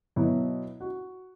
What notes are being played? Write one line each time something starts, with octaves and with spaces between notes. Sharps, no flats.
B2 F#3 B3 E4
F#4